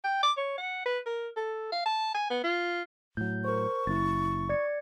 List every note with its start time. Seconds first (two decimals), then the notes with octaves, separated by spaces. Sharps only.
0.04 G5
0.23 D6
0.37 C#5
0.58 F#5
0.86 B4
1.06 A#4
1.36 A4
1.72 F5
1.85 A5
2.14 G#5
2.30 B3
2.44 F4
3.17 A2 F#3 G6
3.45 A#4 C5 C#6
3.87 F#1 E4 A6
4.49 D5 G#6 C#7